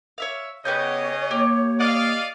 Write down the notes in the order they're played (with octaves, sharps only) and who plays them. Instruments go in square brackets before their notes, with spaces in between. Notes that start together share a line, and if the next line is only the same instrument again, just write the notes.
[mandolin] C#5 E5 F5
[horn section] C#3 D#5 [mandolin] B3 G4 G6 [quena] C#5
[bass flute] A#3 [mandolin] G4
[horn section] D5 D#5 F5